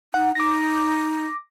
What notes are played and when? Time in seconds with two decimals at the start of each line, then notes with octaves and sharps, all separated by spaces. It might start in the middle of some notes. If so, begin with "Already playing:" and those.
0.14 D#4 F#5
0.35 D#4 D6 A#6